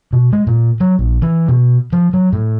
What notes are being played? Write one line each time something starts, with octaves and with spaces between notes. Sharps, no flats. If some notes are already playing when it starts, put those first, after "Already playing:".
B2
G#3
A#2
F#3
A#1
E3
B2
F3
F#3
A2